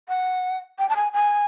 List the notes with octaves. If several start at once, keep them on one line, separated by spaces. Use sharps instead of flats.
F#5
G5
A5
G#5
G#5